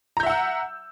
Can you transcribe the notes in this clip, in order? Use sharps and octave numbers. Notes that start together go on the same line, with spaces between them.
E5 F#5 A#5 E6 G6